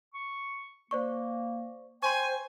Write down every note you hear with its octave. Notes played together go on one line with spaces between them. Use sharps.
C#6
A#3 C5 D5 C#6
C5 G5 G#5 C6 C#6